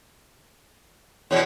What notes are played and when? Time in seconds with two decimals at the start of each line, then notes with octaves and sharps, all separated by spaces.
1.31 E2 B2 C#5